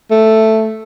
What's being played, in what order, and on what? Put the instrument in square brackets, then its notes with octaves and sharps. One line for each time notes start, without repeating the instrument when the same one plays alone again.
[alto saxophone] A3